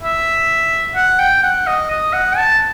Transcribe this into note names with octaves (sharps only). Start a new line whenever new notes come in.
E5
F#5
G5
F#5
D#5
D#5
F#5
A5